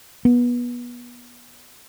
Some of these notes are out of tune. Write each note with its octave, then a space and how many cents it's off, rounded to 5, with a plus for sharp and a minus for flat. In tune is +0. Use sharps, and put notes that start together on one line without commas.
B3 -25